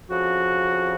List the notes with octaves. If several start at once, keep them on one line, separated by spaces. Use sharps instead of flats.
F2 C#3 F3 F#4